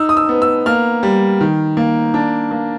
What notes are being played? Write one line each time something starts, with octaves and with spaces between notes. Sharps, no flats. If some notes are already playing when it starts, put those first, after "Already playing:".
Already playing: D#4 E6
D#6
E6
B3
E6
A#3 F6
G3
D#3
A#3
D4
A#3